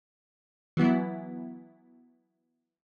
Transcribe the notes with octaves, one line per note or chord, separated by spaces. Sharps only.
E3 F#3 B3 E4